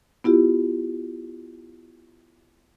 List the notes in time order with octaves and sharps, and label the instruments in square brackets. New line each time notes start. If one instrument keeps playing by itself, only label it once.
[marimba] B3 E4 F4 G4